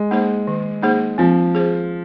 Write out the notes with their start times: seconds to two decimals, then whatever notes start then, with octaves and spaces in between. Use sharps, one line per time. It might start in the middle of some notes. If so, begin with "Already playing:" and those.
Already playing: G#3
0.11 A#3 D#4 G#4 C5
0.47 D#3
0.83 A#3 D#4 G#4 C5
1.18 F3 C4
1.55 G#4 C5